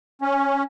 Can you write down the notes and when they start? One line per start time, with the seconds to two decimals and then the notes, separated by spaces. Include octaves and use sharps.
0.22 C#4